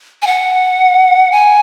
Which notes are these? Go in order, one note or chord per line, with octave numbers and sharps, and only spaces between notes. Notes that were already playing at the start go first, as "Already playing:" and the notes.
G#5
F#5
G#5